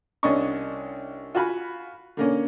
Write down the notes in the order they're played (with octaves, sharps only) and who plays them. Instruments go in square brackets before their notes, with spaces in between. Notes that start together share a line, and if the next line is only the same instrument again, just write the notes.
[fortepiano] C2 C#4 D4 D#5 C#6
F4 F#4 F5 G#5 B5
D3 A#3 C#4